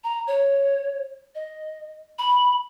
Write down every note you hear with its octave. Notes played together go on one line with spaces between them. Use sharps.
A#5
C#5
D#5
B5